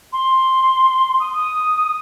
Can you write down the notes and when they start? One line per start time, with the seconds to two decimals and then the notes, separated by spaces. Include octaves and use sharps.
0.13 C6
1.20 D#6